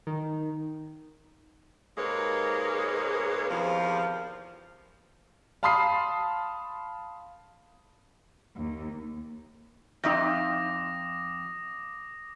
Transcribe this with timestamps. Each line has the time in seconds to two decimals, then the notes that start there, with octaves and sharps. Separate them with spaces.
0.07 D#3
1.98 G#2 C3 G#3 A#3 B4 C#5
3.50 E2 C3 D#3 F3
5.63 F5 A5 B5 C6 D#6 C7
8.56 D#2
10.04 F2 D#4 E5 G5 D6 D#6 A#6